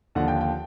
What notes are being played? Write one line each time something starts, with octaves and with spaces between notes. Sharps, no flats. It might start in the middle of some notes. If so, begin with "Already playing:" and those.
D#2 D3 F3 F#5
G5
G5